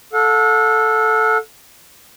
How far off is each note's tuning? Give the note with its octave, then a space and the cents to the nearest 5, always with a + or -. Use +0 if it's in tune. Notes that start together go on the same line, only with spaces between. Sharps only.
A4 +0 F#5 -45